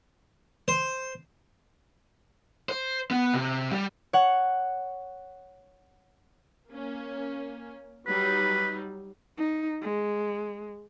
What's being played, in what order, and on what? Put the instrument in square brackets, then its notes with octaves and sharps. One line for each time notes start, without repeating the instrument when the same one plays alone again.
[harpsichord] C5
[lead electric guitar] C5
B3
C3
G3
[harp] C#5 F#5
[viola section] A#3 C#4
[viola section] F#3 G3 D#4 [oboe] B4
[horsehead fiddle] D#4
G#3